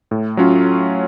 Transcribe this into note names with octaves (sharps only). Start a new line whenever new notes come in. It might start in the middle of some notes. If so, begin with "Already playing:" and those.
A2
F#3 C#4 F4